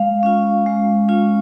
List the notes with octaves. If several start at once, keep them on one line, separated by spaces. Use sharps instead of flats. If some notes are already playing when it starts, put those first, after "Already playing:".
Already playing: G#3 F5
C#4 F4
G#3
C#4 F4